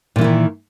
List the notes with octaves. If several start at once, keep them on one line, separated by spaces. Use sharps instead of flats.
A#2 D#3 E3 E4